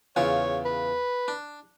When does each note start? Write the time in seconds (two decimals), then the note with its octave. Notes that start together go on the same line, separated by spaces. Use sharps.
0.16 E2 C#3 F4 C#5
0.65 B4
1.28 D4